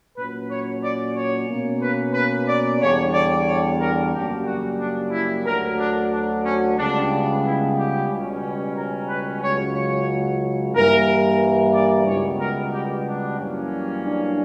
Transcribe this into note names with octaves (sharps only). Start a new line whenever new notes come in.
A#2 F#3 C#4 B4
C#5
D5
C#5
B2 A#3 C#4
B4
B4
D5
E2 D3 G3 C#5
D5
C#5
A#4
F#2 C#3 G3 A#3 G4
F#4
D4
E4
D2 D3 F#3 A#4
D4
D4
C#4
C#2 C#3 G3 B3 D4
E4
G4
C#2 B2 G3 C#4
A#4
B4
C#2 C#3 F#3 C#5
C#5
G2 E3 A#3 A#4
D5
C#2 B2 G3 B3 C#5
A#4
G4
D4
F#2 E3 G3 A#3 C#4
D4